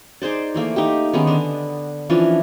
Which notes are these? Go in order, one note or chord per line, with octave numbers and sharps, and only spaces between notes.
D#4 G#4 C5 D5
E3 A3 A#3
D#4 G4
D#3 G#3 B3 C#4
D3 D4
E3 F3 C#4 D4